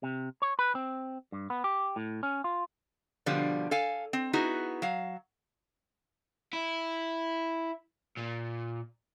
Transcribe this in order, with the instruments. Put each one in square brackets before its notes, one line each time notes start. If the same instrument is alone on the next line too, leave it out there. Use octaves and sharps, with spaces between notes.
[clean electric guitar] C3
C#5
B4
C4
G2
B3
G4
A2
C#4
F4
[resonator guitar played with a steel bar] B2 D3 F3 G3
A4 F5 G#5
C4
B3 D#4 E4 F#4 G#4
F#3 F5
[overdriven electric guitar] E4
A#2